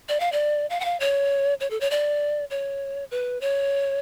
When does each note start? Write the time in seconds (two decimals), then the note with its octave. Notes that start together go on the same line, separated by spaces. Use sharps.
0.09 D5
0.20 F5
0.32 D5
0.70 F5
0.80 F#5
0.85 F5
1.00 C#5
1.60 C#5
1.70 A4
1.81 C#5
1.91 D5
2.50 C#5
3.11 B4
3.41 C#5